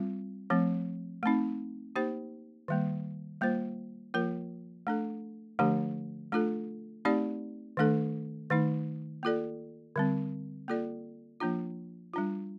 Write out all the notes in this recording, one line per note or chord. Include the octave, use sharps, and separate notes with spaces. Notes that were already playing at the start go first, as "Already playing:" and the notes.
Already playing: G3 C4 F4
F3 A3 C4
A3 C4 D#4
A#3 D#4 G4 C5
D#3 G3 A#3
G3 A#3 F4 C5
F3 A#3 F4 A#4
A3 D4 A4
D3 F3 A3 D4 G4
A3 D4 F4 A4
A3 C4 D#4 G4 D5
D#3 A3 D4 A4
D#3 A3 D#4
A#3 F4 A4 D5
D3 G3 C4
A#3 F4 A4 D5
F3 A#3 D4 F4
G3 D4 F4